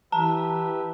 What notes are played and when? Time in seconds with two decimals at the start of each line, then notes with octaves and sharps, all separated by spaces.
0.12 E3 G4 B4 E5 A5 A#5